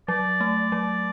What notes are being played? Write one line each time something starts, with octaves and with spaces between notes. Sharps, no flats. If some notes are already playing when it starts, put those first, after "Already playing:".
F#3 D5
A3
F#3